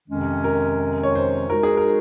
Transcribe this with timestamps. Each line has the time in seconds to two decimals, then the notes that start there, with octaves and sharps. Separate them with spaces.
0.08 F2 C3 D#3 G#3 C#4
0.44 A#4
1.03 C#5
1.15 C5
1.50 G#3 D#4 F#4 A#4
1.63 G#4
1.77 A#4